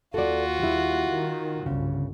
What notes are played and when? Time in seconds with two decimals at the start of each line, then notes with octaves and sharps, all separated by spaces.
0.14 D#2 F4 F#4 A4 D5
0.59 G3 E4
1.10 D#3
1.66 G1 C2 C#3